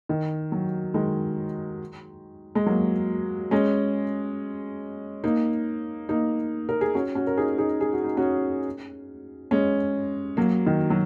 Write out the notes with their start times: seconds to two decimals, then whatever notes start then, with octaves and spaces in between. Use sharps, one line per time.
0.09 D#3
0.52 F#3
0.94 D#3 G#3
2.55 G#3
2.66 F#3 A#3
3.51 G#3 C#4
5.24 A#3 D#4
6.09 A#3 D#4
6.69 A#4
6.81 G#4
6.94 C#4 F#4
7.15 C#4 F#4
7.27 A#4
7.37 D#4 G#4
7.58 D#4 G#4
7.81 G#4
7.93 F#4
8.04 D#4
8.17 C#4 F#4
9.51 G#3 C#4
10.37 F#3 A#3
10.66 D#3
10.90 F#3